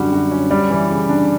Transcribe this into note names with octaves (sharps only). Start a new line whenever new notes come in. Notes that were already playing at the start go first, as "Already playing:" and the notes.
Already playing: F#2 D3 G3 F#4
F#2 F#4
C#4
G3 D5
E3
C#3
D4